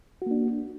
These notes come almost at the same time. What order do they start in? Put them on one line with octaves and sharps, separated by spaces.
F#4 A#3 D4